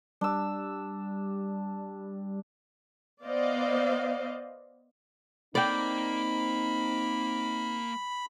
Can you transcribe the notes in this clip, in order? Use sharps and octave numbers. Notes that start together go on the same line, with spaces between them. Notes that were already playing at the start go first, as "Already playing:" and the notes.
G3 D4 E6
B3 C5 D5 D#5 F5
A#3 C4 D#4 D5 G5 B5